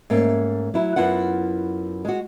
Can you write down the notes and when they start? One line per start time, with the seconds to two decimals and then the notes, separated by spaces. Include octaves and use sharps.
0.10 G#2 A3 A#3 C#4
0.74 F#3 E4
0.96 F#2 B3 E4 F4 F#5
2.05 G#3 F#4